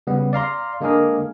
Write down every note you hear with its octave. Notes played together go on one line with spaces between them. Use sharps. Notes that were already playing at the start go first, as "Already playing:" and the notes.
C#3 G3 B3
D5 F5 A#5 C6
D3 G#3 A#3 D4 G#4 A#4